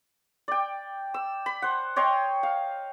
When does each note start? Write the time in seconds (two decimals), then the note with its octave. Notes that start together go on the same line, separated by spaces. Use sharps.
0.48 D5 G5
1.14 E6
1.46 B5
1.62 C5 F#5
1.96 C#5 D#5 G5 C6
2.43 F5